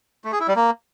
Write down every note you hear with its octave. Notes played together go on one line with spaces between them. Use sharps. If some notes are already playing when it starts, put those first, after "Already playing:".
A3
G#4
E4
G3
A#3